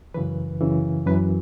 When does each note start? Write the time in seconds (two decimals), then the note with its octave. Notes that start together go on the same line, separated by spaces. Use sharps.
0.14 F#2 C#3 E3 B4
0.61 F#2 C#3 E3
1.06 F#2 E3 B4